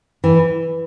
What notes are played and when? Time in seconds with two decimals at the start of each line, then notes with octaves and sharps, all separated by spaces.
0.24 E3